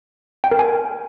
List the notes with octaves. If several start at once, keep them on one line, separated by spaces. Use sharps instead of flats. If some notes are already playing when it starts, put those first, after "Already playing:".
G5
A#4
G#5